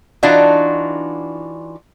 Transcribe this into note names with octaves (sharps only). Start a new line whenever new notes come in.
E3 D4 D#4 F4 F#4